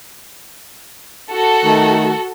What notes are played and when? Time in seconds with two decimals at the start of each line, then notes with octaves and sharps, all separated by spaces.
1.30 F#4 A4
1.65 D#3 A3